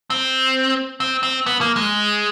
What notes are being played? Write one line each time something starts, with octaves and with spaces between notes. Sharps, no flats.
C4
C4
C4
B3
A#3
G#3